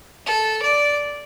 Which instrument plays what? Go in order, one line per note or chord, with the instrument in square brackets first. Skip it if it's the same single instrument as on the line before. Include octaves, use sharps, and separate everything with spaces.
[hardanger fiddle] A4
D5